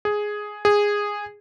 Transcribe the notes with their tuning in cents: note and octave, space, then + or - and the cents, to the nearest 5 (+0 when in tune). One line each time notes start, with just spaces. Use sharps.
G#4 +5
G#4 -10